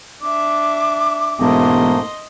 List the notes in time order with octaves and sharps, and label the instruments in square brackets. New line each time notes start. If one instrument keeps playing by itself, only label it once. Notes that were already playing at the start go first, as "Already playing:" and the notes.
[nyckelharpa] D4 E5 [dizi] D6
[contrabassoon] E1 [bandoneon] G#2 A3 A#3 [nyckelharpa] D#5 C6